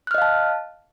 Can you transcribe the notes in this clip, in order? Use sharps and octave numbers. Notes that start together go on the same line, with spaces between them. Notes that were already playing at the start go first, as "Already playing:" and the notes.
D#5 F5 A5 F6 F#6